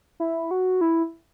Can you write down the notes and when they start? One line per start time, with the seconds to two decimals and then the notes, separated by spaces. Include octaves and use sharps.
0.20 E4
0.51 F#4
0.81 E4